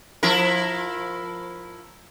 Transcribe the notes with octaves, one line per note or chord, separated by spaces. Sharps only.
F3 E4 A#4